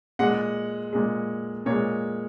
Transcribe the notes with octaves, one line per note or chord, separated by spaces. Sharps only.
A#2 G#3 F#5
A#2 G#3
A#2 G#3 C#5